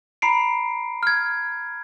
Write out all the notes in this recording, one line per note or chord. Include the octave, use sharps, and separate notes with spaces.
A#5 B5 C7 D7
F6 G#6